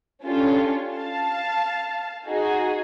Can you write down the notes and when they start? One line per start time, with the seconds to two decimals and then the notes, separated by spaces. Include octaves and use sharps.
0.23 C#4 D4 F4 G4 A4 C#5
0.93 F5 A5
2.26 D#4 F#4 G#4